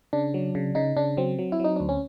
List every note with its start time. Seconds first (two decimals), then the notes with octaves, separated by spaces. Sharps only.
0.13 C#3 D4
0.34 F#3
0.55 C#3
0.75 C#3 D#4
0.96 C#3 D4
1.17 F#3 C4
1.39 F#3
1.52 E4
1.60 F#3 D#4
1.76 D2 D4
1.89 C#4